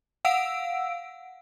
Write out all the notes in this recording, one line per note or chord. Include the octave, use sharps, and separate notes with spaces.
F5 F#5 E6 D7